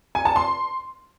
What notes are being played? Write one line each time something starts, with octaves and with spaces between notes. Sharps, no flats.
G#5
A5
C6